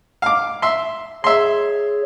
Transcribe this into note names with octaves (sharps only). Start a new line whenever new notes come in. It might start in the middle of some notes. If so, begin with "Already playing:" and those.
F5 D6
E5 C6
G#4 C#5 E5 C6